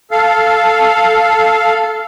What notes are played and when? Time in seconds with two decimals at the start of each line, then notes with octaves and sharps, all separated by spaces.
0.11 A4 F5